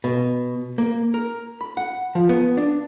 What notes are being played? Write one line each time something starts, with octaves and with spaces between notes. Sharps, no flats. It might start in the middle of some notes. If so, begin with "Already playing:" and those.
B2
A#3
A#4
B5
F#5
F3
B3
D4